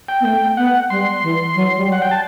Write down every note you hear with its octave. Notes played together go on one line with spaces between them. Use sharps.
G5
B3
A3 G5
B3 F#5
G3 C6
E3
F#3
G3
F#3 F#5
G5
A5